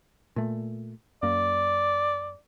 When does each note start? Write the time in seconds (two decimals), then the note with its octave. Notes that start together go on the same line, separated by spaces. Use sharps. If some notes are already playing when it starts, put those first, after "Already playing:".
0.36 A#2 A3
1.23 F#2 A#3 D5